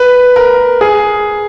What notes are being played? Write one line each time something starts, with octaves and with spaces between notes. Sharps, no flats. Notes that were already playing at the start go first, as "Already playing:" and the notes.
Already playing: B4
A#4
G#4